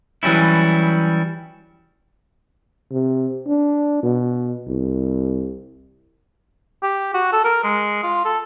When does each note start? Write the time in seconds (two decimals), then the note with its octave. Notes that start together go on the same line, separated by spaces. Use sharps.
0.23 E3 F#3 G3 C#4 E4
2.91 C3
3.47 D4
4.03 B2
4.68 C2
6.83 G4
7.14 F#4
7.33 A4
7.45 A#4
7.64 G#3
8.03 F4
8.25 A4